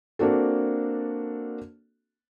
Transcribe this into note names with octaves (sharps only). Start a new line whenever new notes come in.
A#3 C4 D4 F#4 A4